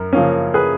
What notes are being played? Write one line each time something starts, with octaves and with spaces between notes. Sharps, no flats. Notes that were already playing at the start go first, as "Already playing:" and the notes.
Already playing: F#2 A#4
C#3 F3 A#3 C#4
G#4 B4